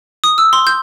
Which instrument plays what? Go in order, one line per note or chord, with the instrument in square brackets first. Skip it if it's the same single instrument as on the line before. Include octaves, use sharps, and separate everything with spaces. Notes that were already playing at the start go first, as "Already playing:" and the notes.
[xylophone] D#6
E6
C6
G6